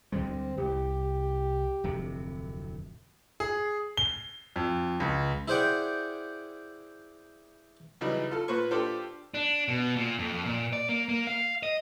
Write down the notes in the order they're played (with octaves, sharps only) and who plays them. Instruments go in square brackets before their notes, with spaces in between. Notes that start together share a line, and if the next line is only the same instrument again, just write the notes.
[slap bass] D2 G3 G#3 [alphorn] C4
[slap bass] C2 [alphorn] G4
[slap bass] D1 F2 C3
[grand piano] G#4
G7
F2
C#2
[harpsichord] E4 G#4 C5 D5 F#5 G5
[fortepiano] C#3 E3 F#3 G3 D#4
F4 A4
A#2 B4 C5 C#6
D4 F4 G4 A4 C5
[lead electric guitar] D4
B2
A#2
F2
A#2
D5
A#3
A#3
F5
D#5